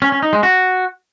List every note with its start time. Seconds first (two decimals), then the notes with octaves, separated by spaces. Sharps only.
0.02 C#4
0.12 C#4
0.22 D#4
0.33 G#3
0.43 F#4